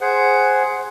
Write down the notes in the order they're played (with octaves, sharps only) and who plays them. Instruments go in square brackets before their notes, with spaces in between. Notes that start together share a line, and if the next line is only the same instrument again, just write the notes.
[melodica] G#4 C5 F#5